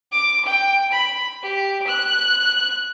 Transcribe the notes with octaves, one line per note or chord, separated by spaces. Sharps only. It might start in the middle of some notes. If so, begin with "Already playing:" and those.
D6
G5
B5
G4
F#6